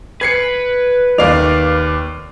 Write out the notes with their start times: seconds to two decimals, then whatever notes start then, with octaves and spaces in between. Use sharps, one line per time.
0.21 B4 G#6 C7 C#7
1.18 D#2 D5 F5 F7